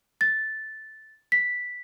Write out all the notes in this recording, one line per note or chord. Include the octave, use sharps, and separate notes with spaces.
A6
B6